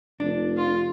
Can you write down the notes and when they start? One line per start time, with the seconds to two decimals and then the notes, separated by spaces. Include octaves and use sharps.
0.20 F1 D4
0.57 F4